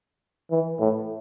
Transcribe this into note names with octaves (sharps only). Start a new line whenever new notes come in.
E3
A2